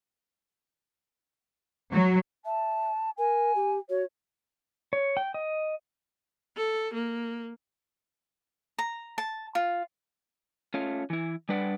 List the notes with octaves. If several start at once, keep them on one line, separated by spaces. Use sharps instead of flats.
F#3
E5 A5
A#4 G#5
G4
F#4 C#5
C#5
G5
D#5
A4
A#3
A#5
A5
F4
A3 C#4 F4
E3 E4
G3 D4 B4 D5 F#5